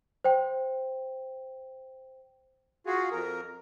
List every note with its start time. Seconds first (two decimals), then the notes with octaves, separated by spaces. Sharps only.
0.24 C5 G5
2.86 F4 F#4 G#4
3.12 F2 A#4